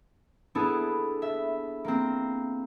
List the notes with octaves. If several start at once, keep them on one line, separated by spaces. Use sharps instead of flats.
B3 D4 E4 G#4 A4
E5
A#3 C4